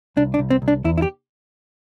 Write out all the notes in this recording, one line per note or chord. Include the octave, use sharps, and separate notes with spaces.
C2 D4
D4
C2
C4
C2
D4
E2 E4
E4
G4